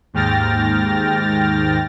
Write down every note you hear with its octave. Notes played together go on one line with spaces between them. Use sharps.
D#2 G#2 G5 F6 A6 A#6